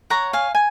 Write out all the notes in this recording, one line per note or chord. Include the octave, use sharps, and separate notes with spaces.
C#5 F#5 A#5
F5 G#5
G#5